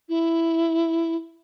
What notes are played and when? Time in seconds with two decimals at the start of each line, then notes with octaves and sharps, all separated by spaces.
0.09 E4